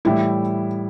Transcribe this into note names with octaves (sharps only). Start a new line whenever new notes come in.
A2 E3 G3 E4